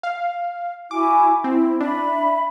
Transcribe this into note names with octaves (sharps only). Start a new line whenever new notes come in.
F5
E4 F#4 G#5 D6
C4 E4
D4 E5 B5